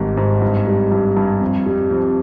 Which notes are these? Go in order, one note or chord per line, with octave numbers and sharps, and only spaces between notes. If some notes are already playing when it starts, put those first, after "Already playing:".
Already playing: G#1 G#2 G3
G#2
G2
G3
G2
G2
F2
G3
F2